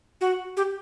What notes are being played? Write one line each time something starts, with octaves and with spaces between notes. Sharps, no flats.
F#4
G4